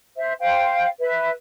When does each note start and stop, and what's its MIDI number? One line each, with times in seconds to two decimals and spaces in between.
0.16 0.32 72
0.16 0.32 76
0.40 0.86 72
0.40 0.86 77
0.40 0.86 79
0.99 1.29 71
0.99 1.29 76